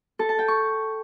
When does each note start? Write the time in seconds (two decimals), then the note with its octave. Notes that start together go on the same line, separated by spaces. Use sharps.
0.19 A4
0.29 A5
0.39 G5
0.48 C#6